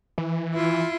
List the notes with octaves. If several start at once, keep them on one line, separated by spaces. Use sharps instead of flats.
E3
E4 F4